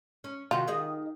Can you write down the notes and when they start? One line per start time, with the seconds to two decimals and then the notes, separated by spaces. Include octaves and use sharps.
0.24 C#4
0.51 C3 D#3 F4 F#4
0.67 D#3 G#4 D#5